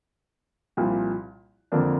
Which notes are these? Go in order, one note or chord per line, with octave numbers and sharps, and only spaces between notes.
C2 A#2 F3
F2 D3 F3 A#3 D4